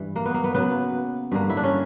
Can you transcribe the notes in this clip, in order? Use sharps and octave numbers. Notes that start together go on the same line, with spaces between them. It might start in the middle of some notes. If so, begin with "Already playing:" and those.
Already playing: G2 E3
A#3
B3
A#3
B3
C#3 F#3 A#3 B3
G2 D3 A#3
E4
D4
C#4